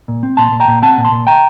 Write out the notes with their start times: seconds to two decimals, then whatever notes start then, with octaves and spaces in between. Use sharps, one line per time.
0.08 A#2
0.23 C4
0.37 A#2 A5 C6
0.52 A#2
0.60 G5 A#5
0.68 A#2
0.82 C4 F#5 A5
0.98 A#2
1.05 A5 C6
1.12 A#2
1.27 G5 A#5